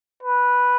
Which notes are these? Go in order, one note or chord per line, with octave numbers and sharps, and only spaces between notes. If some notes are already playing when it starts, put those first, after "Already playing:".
B4